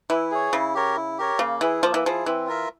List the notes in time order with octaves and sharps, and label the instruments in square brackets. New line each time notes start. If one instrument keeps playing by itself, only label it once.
[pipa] E3 [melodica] E4
[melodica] G#4 C#5
[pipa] C#3 [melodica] E4
[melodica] G4 A#4 C#5
E4
G4 A#4 C#5
[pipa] C#3 [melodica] A#3
[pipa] E3 [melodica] E4 G#4
[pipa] F3 [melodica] A#3
[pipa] E3
[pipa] F3 [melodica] E4 G#4
[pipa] E3 [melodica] C4
[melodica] F4 A#4 E5